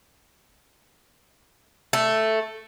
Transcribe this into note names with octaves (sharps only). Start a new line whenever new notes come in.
A3